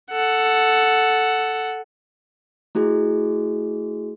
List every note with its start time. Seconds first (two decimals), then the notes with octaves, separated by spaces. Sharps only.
0.11 A4 F#5
2.75 A3 E4 F#4 G#4